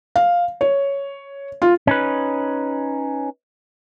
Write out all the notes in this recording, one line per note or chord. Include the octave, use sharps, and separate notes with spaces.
F5
C#5
F4
C#4 D#4 B4